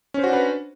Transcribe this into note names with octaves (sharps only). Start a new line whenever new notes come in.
C#4 D4 F#4 B4 C5